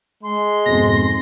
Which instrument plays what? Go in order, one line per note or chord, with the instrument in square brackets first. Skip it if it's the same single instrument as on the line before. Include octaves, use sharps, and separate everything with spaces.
[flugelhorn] G#3 [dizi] C6
[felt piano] F2 G#2 B2 [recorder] A#6